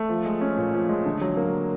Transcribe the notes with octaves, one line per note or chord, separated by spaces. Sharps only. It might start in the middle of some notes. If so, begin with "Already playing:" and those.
Already playing: A3
F3
G#3
C#4
A#2
F3
G#3
D3
F#3
A#3